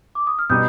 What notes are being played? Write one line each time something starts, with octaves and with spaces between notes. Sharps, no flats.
D6
D#6
F6
B2 G3 B3 D#4 D#6 G6